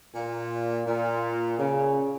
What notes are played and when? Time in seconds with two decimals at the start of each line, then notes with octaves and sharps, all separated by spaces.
0.15 A#2
0.86 A#2
1.58 C#3